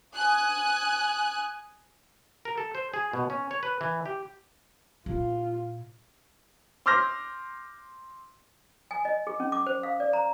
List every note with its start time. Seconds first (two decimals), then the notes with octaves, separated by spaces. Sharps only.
0.15 G#5 D#6 F#6
2.45 A#4
2.58 A4
2.75 C5
2.94 G#4
3.13 B2
3.30 C#4
3.51 C#5
3.63 B4
3.81 E3
4.06 G4
5.06 A#2 E4 F4
6.86 C6 D6 E6 F6 G6 A#6
8.91 G#5
9.05 D#5
9.27 G#4
9.40 C#4
9.52 D6
9.66 C5
9.83 F5
10.00 D5
10.13 A#5